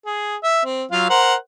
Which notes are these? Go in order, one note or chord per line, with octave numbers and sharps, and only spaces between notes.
G#4
E5
C4
F#3 F4 F5
A#4 C5 F#5